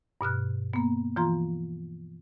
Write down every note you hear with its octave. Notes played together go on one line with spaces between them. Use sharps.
G2 B2 F6 F#6
A#3 B3
E3 F3 F4 A#5 C6